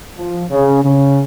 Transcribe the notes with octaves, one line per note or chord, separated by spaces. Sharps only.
F3
C#3
C#3